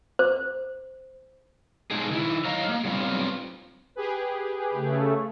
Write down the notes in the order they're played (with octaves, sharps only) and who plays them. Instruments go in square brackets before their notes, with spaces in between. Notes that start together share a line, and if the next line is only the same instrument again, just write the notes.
[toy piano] C5
[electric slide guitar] B2 G#3 D4 D#4 G#4
D#3 E4
F#3 D#5 F5 A#5
A#3
F#3 G3 B3 C4 E4 F4
[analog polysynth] G4 G#4 B4
[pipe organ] C#3 A3